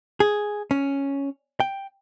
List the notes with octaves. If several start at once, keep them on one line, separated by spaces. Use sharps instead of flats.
G#4
C#4
G5